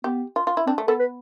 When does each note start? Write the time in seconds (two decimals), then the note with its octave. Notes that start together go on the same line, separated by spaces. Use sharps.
0.04 B3 G4
0.36 F4
0.47 F4
0.57 E4
0.67 C4 D4
0.78 A3
0.88 B3 A4
1.00 B4